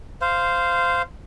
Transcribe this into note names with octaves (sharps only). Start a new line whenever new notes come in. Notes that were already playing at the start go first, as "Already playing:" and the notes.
C5 F5